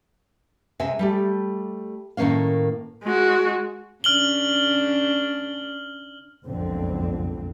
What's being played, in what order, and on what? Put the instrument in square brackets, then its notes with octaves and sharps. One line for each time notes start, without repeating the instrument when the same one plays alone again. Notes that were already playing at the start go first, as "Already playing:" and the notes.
[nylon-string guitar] C3 G#3 E5 G#5
G3 A3 G4
A2 D#3 A3 A#3 C#4 F5
[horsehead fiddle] G#3 F#4
[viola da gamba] C#3 D4 [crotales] F6 F#7 G7
[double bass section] F#1 B1 F2 G#2 D3 C4